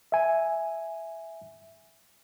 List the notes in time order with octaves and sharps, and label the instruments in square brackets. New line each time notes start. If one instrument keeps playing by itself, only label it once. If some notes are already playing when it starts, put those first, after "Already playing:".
[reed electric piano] E5 G#5